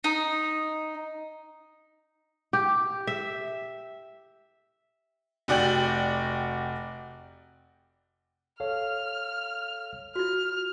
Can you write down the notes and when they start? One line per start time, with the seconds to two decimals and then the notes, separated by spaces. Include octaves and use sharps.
0.04 D#4
2.53 G4
3.07 E5
5.48 F1 F#4 D5 G5 F#7
8.60 A4 C#5 F5 F6
10.16 F4 F#4 F6